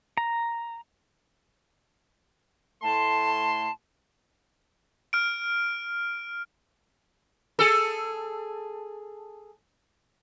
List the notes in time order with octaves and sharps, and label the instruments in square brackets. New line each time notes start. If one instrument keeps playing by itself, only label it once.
[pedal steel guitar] A#5
[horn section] A2 A3 C6 [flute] A5
[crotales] F6 D7
[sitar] G#4 A4